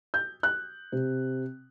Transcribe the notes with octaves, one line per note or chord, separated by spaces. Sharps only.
G6
F#6
C3